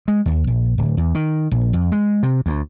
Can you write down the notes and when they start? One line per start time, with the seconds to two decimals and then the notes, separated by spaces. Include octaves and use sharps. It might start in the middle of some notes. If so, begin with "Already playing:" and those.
0.08 G#3
0.26 D#2
0.47 A#1
0.78 D1
0.97 E2
1.15 D#3
1.51 A#1
1.73 F2
1.92 G#3
2.23 C3
2.46 D2